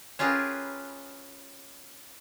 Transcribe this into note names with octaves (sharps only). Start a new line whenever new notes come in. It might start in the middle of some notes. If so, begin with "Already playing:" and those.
C#4 F4 G4 G#4 A#4 B4